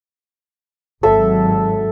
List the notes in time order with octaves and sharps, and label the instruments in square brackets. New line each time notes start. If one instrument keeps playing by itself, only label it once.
[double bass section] G#1 F#3 [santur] A4 E5